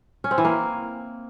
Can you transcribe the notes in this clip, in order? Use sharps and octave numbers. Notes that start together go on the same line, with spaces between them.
C#4
C4
E3
A#3